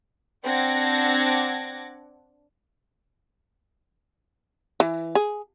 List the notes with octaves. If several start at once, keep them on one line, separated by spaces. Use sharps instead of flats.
C4 D4 F#5 D6 G#6 A#6
E3
G#4